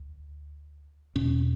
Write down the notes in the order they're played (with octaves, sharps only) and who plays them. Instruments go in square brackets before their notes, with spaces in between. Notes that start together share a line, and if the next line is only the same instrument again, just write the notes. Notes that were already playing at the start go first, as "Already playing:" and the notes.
Already playing: [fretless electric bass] D2
E2 B2 C#4